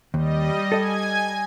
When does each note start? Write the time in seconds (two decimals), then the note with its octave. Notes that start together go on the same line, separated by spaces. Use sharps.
0.14 D#2 G3 D#5
0.72 A4 D#5 G#5 G#6